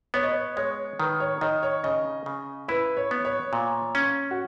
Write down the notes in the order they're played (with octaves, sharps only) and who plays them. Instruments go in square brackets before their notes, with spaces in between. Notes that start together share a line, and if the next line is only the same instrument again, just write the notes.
[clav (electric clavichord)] B3 [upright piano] C#5
[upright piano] D#5
C#5
[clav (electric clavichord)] G#3 [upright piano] C#5
[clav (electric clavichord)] D#3 [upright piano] B4
[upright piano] C#5
[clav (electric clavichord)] D#3 [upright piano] D#5
[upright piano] C#5
[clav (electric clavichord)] C#3 [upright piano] D#5
[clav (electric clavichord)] C#3
[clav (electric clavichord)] E4 [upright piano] B4
[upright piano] C#5
[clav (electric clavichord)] B3
[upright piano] C#5
[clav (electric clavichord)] A#2
C#4
[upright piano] F#4